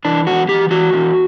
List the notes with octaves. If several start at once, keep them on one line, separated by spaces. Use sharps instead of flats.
E3 D4
E2 F#4
E3 G4
E3 F#4
E2